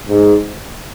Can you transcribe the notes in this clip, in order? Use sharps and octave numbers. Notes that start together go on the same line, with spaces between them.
G#2